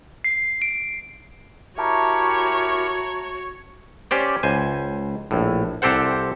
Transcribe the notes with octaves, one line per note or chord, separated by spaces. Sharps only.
C7
D7
E4 F#4 G4 A#4 C#5 E5 A5 A#5
C#4 G4 C5 D5
C#2 C5 G#5
A#1 A2
C2 C4 G4 A4 C5 F#5